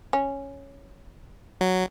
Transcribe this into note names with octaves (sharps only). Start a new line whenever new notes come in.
C#4
F#3